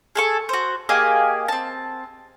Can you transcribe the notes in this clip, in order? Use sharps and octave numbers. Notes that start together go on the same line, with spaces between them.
G#4 A4 C#6
F#4 C5
A#3 G4 G#4 D#5
C4 A5